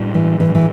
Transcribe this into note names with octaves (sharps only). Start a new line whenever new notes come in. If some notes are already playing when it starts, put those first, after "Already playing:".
Already playing: A2 G3 D4
E3
E3
E3